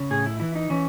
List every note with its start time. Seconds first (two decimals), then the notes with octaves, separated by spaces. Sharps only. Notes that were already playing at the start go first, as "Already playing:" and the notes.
Already playing: C#3
0.10 A2 G#4
0.26 E4
0.40 E3 E4
0.55 D#4
0.70 E3 C#4